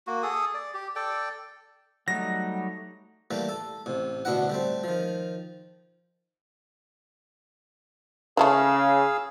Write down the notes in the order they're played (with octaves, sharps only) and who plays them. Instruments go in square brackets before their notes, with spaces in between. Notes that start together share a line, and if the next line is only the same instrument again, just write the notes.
[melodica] A#3 F#4
G#4 A4 D#6
D5
G4
A4 D5 G5
[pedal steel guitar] F#3 G3 D#4 [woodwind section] A3 [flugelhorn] F#5 [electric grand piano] A#6
[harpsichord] E3 G3 A3 A#3
A4
A1 C3
A1 D2 B2 D4 E4 F#5
G3 A3 C4
D#3 F3
[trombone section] C#3 [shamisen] E3 G3 A3 [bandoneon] G#4 F5 E6